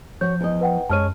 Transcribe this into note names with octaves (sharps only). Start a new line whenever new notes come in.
F3 F#4 C#5 G6
E2 D#5
B4 F#5 G5
F#2 G#3 C#5 A5 F6 D#7